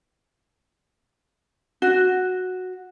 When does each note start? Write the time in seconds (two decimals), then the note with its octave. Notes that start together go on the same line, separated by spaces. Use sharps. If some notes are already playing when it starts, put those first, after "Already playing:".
1.82 F#4